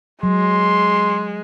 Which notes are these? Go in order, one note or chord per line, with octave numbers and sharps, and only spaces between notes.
F#3 G#3 C6